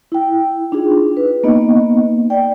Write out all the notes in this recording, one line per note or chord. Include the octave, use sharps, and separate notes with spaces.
E4 G5
D4 D#4 F4 G#4
B4
A#3 B3 D#4 D#5
D5 G5